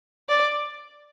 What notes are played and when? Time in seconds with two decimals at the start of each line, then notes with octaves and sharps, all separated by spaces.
0.29 D5